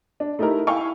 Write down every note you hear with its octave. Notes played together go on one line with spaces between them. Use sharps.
D4
A3 D#4 E4 G4 A#4
E4 F5 G5 G#5 C#6